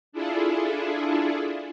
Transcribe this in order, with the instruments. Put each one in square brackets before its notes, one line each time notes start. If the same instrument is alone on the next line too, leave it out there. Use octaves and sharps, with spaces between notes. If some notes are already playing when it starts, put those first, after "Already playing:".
[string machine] D4 E4 F4 G#4 A4